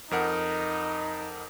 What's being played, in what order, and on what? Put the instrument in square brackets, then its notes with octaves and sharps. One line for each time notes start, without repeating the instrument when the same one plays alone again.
[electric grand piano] F2 A#4 F#5 [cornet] D#4